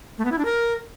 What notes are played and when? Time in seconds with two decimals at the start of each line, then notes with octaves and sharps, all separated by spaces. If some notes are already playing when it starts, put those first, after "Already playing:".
0.18 A3
0.25 B3
0.32 E4
0.38 D4
0.45 A#4